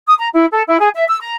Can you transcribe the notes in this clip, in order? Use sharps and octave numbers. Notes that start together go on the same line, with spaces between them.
D#6
A#5
E4
A4
E4
G#4
E5
E6
A#5